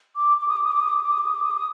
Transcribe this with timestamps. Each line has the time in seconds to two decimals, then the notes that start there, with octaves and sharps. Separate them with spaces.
0.16 D6
0.41 D6
0.48 D#6
0.57 D6
0.64 D#6
0.72 D6
0.80 D#6
0.88 D6
0.96 D#6
1.03 D6
1.12 D#6
1.19 D6
1.26 D#6
1.35 D6
1.43 D#6
1.51 D6
1.58 D#6